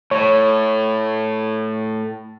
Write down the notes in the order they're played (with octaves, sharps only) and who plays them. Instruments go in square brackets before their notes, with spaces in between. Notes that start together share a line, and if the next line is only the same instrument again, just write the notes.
[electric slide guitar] A2 [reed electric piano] C#5